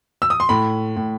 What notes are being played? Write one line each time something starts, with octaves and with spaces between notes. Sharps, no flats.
E6
D#6
C6
A2 B5
A2